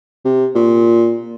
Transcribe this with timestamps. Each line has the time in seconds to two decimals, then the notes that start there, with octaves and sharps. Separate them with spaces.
0.25 C3
0.55 A#2